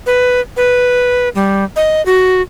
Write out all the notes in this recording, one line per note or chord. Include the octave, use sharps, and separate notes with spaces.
B4
B4
G3
D#5
F#4